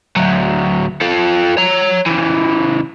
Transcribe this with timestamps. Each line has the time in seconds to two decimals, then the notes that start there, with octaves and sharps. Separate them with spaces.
0.17 D2 F#3
1.02 F4 A4
1.58 C#5 A#5
2.06 C#3 E3